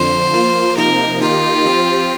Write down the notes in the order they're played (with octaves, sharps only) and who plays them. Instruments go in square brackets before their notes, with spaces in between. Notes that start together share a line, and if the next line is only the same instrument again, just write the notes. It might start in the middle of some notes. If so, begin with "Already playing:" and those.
Already playing: [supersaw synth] F2 D3 F3 [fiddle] C5
[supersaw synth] F3 A#3 F4
[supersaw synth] C3 F3 A#3 D#4 [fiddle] A#4
[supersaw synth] D#3 A#3 D#4 G4 [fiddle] F4
[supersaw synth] F3 C4 G4